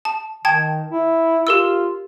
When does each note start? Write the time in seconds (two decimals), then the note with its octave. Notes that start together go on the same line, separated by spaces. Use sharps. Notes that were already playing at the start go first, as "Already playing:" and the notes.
0.05 A5
0.45 D#3 G5 A5 G#6
0.91 E4
1.47 F4 G4 A#4 E6